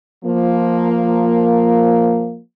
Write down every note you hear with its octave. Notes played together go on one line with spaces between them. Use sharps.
F3 A#3